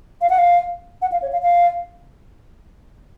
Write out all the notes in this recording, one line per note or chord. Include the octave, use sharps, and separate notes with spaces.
F5
F#5
F5
F#5
F5
C#5
F5
F5